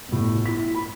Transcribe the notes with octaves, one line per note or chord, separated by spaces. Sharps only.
G1 A2
E4 B6
B5